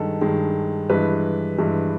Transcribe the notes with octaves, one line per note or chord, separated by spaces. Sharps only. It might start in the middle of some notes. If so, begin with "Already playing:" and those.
Already playing: G2 D#3 G#3 A4
G2 D#3 G#3
G2 E3 G#3 B4
G2 E3 G#3